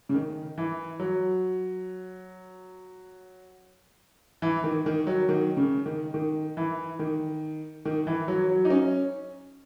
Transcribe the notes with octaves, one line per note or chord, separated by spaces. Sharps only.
C#3
D#3
E3
F#3
E3
D#3
D#3
F#3
D#3
C#3
D#3
D#3
E3
D#3
D#3
E3
F#3
F#3
D#4
C#4